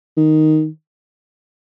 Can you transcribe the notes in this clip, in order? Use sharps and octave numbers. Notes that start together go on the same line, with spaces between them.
D#3